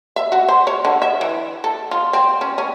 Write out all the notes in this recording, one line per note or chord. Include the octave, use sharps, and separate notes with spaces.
E5
F#4
C5
C#5
D3
E5
E3
A4
F4
C4
C#4
C#4